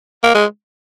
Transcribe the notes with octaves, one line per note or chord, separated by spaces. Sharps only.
A#3
G#3